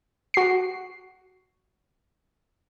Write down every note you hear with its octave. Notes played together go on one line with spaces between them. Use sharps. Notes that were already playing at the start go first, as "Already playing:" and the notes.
F#4 C7